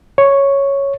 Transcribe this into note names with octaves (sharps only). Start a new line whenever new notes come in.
C#5